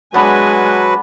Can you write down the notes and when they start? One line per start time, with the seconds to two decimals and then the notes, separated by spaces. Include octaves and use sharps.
0.14 F#3 G#3 B3 D4 F#4 B4 G#5 B5